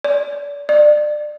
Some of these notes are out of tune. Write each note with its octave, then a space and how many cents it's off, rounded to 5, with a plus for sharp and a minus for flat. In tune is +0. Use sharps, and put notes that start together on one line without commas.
D5 -35
D5 +25